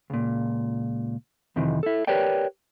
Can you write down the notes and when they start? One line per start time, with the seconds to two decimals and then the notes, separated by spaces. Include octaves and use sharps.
0.10 C#2 A#2
1.56 F2 C3 D#3 E3
1.83 E4 A4
2.07 G4 A#4 B4 C#5 D5 G5